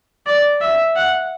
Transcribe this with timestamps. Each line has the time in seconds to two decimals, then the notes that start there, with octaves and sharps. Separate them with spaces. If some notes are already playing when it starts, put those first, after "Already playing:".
0.26 D5
0.61 E5
0.96 F#5